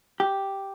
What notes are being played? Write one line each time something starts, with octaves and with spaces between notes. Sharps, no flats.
G4